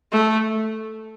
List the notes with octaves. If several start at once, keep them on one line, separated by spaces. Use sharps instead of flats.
A3